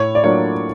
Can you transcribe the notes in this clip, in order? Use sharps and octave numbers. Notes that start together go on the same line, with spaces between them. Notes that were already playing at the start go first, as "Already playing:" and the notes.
Already playing: A2 C#5
D5
F#3 A#3 D4 F4 C#5